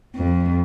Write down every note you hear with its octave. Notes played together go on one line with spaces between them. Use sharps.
F2